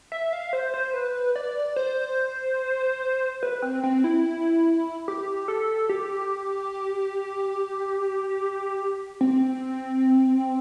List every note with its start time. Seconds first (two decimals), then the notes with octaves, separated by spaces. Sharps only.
0.12 E5
0.33 F5
0.53 C5
0.74 C5
0.94 B4
1.36 D5
1.76 C5
3.43 B4
3.62 C4
3.84 C4
4.04 E4
5.08 G4
5.48 A4
5.89 G4
9.21 C4